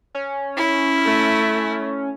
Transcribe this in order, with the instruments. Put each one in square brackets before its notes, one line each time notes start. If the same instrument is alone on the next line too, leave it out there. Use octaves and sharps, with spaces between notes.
[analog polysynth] C#4
[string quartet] E4
[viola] A3